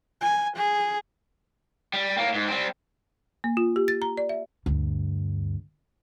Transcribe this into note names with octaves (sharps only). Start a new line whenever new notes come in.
G#5
G#4
G3
A2 A#3
G#2
G3 C4
A#3
F4
G4
A6
A#5
D5
E5
D2 G2